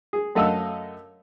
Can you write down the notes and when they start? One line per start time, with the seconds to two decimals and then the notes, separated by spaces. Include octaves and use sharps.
0.13 G#4
0.35 F#2 A3 D#5 F5 F#5 E6